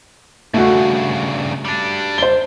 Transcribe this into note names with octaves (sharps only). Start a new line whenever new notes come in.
G2 C#3 A3 F#4
G3 D4
C5 G7